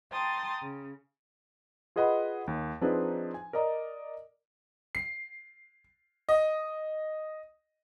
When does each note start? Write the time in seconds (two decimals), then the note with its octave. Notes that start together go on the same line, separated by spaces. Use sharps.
0.12 G5 A5 A#5 C6 D#6 A6
0.61 C#3
1.96 F4 G#4 B4 D#5 F#5 B5
2.47 D#2
2.81 F3 C4 D4 D#4 G#4 B4
3.34 G#5
3.53 A#4 D5 D#5 A#5
4.95 C7
6.29 D#5